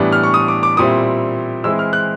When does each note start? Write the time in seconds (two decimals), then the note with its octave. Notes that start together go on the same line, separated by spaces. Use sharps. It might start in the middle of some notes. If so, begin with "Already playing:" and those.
Already playing: A2 E3 G3 B3 D4
0.12 F6
0.23 C#6
0.34 D#6
0.48 D6
0.63 D6
0.77 A#2 G3 C4 E4 D#6
1.64 E3 G#3 C4 E4 E6
1.79 F6
1.93 F#6